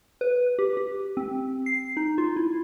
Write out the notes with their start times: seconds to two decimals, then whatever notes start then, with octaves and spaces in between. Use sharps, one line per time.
0.21 B4
0.59 G4
0.77 G4
1.17 C4
1.66 C7
1.97 D#4
2.18 F4
2.36 E4